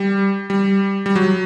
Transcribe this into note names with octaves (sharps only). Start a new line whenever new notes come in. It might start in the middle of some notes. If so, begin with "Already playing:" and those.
Already playing: G3
G3
G3
F#3